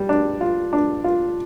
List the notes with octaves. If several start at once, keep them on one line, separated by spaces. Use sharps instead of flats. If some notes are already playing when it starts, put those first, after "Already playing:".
Already playing: G3
D4
F4
D4
F4